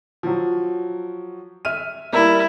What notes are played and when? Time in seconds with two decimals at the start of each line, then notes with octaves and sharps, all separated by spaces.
0.23 F3 F#3
1.65 E5 F6 D#7
2.13 G3 A#3 E4 A#4